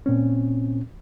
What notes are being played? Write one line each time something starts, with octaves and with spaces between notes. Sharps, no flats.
A#2 C4 C#4